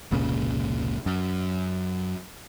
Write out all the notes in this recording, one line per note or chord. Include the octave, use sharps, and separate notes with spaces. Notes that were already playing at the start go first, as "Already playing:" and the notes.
F1 C#2 A#2 C#3
F#2